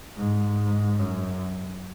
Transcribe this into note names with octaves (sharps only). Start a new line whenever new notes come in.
G#2
F#2